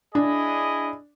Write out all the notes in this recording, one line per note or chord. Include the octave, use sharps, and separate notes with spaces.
D4 E4 G#4 D#5